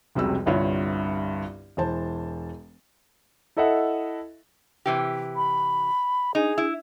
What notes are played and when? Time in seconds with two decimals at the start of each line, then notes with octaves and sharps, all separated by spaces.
0.15 F1 C#2 C3 G3 F#4 E6
0.46 G1 C2 G2 F4 C#5
1.77 E1 E3 C5 A5
3.57 E4 A4 D#5 E5 F#5
4.86 C3 E3 G4
5.36 B5
6.35 D#4 G#4
6.58 E4